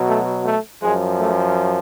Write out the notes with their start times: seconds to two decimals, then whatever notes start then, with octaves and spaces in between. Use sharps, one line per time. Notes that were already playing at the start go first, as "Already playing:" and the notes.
Already playing: B2 F#3
0.09 A3
0.46 A3
0.82 F#2 F3 G#3
1.20 A3